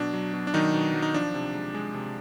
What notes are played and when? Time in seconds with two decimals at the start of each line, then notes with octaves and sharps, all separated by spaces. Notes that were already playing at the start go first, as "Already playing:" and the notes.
Already playing: B2 F#3 D4
0.13 F#3
0.33 B2
0.47 D4
0.54 D#3 F#3 D#4
0.74 B2
0.94 F#3
1.02 D#4
1.14 F3 D4
1.34 C3
1.54 G#3
1.74 G#3
1.94 C3